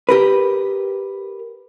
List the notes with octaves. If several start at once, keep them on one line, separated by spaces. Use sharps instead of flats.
G4 A#4 B4